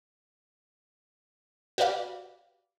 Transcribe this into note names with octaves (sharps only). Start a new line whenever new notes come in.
F#4 G4 B4 D5 F5